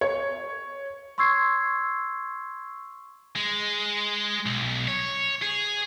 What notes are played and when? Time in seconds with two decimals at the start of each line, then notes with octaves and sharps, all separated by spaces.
0.01 C#5
1.18 C6 C#6 E6 G#6 C7
3.36 G#3
4.46 B1
4.88 C#5
5.42 G#4